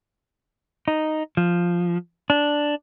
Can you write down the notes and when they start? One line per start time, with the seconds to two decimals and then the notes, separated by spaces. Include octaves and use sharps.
0.88 D#4
1.37 F3
2.30 D4